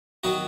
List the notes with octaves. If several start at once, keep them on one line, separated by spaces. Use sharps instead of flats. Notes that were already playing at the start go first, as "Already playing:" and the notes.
D#3 F#3 D#4 F#4